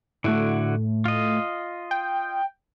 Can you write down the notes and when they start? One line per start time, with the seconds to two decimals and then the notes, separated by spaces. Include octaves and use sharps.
0.24 A2 D3 A3 E4 F#4
1.05 F4 D#5
1.91 G5